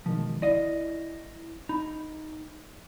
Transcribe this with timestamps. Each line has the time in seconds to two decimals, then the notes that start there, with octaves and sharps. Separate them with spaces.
0.06 B2 D#3 F3 G#3
0.42 G1 E4 D5 D#5 F5 A#6
1.69 D#4 B5